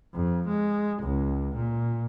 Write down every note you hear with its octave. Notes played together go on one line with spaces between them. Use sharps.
F2
G#3
C#2
A#2